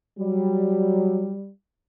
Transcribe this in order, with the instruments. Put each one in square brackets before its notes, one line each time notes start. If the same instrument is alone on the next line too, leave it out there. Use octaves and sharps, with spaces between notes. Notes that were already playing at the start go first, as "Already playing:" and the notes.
[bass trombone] F#3 [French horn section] G3